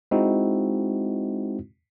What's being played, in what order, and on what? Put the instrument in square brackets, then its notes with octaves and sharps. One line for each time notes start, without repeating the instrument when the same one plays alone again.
[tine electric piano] G#3 C4 D#4 E4 F#4